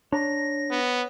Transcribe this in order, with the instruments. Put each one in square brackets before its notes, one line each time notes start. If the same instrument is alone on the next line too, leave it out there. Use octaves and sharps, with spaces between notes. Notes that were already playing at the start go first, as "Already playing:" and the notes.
[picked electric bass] D4 [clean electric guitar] C#5 A#5 [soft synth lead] A#6
[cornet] B3